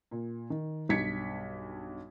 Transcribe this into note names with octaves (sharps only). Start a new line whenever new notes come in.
A#2
D#3
B1 G2 G#6 B6 C#7